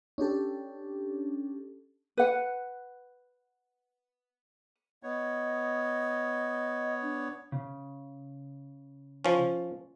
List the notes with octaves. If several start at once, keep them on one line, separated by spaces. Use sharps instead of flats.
C#4 D4 G4 A4
B4 F#5
B3 C#5 D#5
D4
C#3
F3 C#4